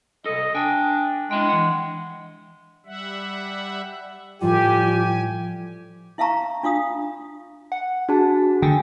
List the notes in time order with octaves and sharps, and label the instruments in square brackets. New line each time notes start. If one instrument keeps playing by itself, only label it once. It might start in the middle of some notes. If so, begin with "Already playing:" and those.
[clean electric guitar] C2 A4 [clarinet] D#5
[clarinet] D4 [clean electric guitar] G5 G#5
[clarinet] G#3 [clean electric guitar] D4 E4 G5
[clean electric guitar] E3 F#5
[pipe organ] G3 E5 F#5
[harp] A2 F3 G3 [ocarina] F4 [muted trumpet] G4 [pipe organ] G#5
[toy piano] E4 E5 F5 A5 A#5 C#6
D4 F4 F5 D#6
[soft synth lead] F#5
[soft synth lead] D4 [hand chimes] F#4 G#4 A5
[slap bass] D3 [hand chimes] A3 G#5 [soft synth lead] G5